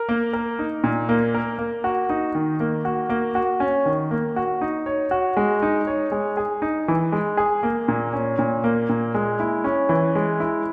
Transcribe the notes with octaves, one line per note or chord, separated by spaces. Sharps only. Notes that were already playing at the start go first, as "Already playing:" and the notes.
Already playing: A#4
A#3
A#4
D#4
A#2
A#3
A#4
A#3
F#4
D#4
D#3
A#3
F#4
A#3
F#4
C#4
D#3
A#3
F#4
D#4
C#5
F#4
G#3
D#4
C#5
G#3
G#4
D#4
E3
G#3
G#4
A#3
A#2
C#4
A#2
A#3
A#2
G#3
E4
C#4
E3
G#3
E4